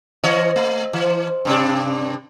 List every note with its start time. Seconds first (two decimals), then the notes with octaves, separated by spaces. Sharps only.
0.24 E3 C#5 D#5
0.56 A3
0.93 E3
1.45 G2 C3 D4